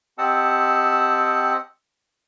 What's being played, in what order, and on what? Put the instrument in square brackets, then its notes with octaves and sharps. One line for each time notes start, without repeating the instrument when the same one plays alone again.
[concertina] C4 G4 D#5 F#5 A5 E6